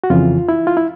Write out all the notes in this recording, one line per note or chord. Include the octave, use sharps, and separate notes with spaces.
F#4
F2 C#3 E3 F4
E4
F4
E4